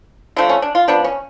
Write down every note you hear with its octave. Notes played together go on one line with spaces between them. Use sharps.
D3 F3 A3 D4
C#4
D4
F4
F3 B3 D4
C#4